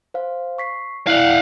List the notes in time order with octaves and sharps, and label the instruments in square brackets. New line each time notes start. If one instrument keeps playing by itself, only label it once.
[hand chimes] C5 F5
C#6 B6 C7
[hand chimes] E4 D5 [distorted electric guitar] F5 F#5